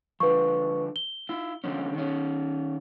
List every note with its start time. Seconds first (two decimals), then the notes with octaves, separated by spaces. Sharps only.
0.20 D3 F3 B4 C#6
0.96 G7
1.29 E4 F4
1.64 D3 F3 C#4
1.95 D#3 C#4